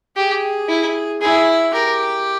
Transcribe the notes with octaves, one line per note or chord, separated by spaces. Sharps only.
G4 G#4
E4
E4 G#4
G4 A#4